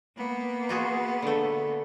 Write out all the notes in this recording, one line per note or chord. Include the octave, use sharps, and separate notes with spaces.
A#3 B3
F4 F#4 G#4
D3 A3